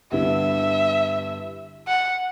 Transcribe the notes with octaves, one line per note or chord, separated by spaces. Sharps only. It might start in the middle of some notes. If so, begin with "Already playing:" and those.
G2 D3 G3 B3 E4 E5
F#5